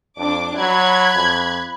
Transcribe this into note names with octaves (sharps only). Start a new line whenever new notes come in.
F2 D4 D6
F#3 B5 F#6 G#6
F2